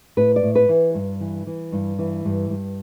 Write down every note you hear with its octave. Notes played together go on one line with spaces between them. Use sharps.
A2 B4
D5
A2
B4
E3
G2
E3
E3
G2
E3
G2
G2